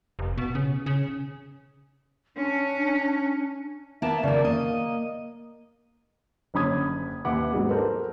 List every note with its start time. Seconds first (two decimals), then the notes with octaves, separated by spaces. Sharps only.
0.19 F1
0.37 B2
0.55 C#3
0.86 C#3
2.37 C#4 D4
4.02 A#3 B3 E5 A5
4.23 C#3 A#3 D5
4.45 A#3 D#5
6.54 F#1 D3 C#4 B5 D#6 G#6
7.25 D#2 B4 E5 F#5 B5 D6
7.52 G#2 F#3 G#3 B3
7.70 A4 A#4 C5